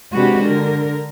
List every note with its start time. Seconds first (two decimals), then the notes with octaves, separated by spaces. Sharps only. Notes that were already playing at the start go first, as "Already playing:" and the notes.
0.14 C3 G#3 D4 F#4 G4 B4
0.45 D3 A#4